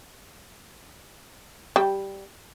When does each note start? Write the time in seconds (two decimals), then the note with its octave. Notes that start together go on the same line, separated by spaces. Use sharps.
1.76 G3 G5